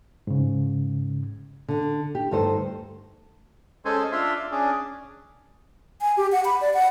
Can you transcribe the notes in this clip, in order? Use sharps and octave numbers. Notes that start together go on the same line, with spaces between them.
G#2 C#3
D3
G4
D2 G2 D#4 A4 C5
G#3 C#4 A4 C5 G#5
D4 F4 E5 C6
D5
C#4 D4 G#4 D5
G#5
G4
F#5
B5
D5
F#5